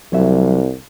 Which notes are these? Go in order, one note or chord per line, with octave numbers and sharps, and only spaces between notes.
C2 F#3 E5